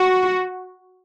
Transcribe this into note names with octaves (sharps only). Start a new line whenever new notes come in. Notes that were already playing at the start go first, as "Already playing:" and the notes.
Already playing: F#4